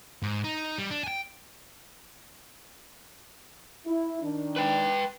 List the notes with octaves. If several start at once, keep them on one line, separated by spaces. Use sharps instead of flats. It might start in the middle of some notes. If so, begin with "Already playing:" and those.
G#2
D#4
G3
D4
G5 G#5
E4
D#3 D4
B4 G5